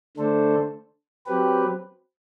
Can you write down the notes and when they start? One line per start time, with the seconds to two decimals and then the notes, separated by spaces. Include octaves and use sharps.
0.17 D3 A3 D4 A4 C5
1.26 F#3 C4 G4 B4